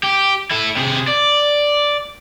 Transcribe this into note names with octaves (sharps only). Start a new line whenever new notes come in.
G4
E4 A4
C3 G#4
D5